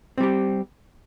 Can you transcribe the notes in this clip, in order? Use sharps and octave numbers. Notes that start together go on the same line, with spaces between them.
G3 C4 G4